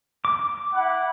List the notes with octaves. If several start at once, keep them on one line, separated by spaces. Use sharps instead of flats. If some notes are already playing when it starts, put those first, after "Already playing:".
D6
E4 F#5